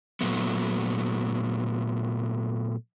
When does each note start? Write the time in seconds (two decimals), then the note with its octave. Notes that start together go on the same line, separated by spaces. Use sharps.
0.21 A#2 F#3 A3 B3